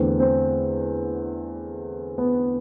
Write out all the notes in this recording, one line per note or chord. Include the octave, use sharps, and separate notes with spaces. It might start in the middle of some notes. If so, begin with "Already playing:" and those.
Already playing: E2 D3 A3 C4
C4
B3